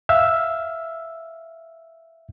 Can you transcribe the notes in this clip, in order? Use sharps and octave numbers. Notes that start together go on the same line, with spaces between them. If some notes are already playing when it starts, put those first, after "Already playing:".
E5 F5 E6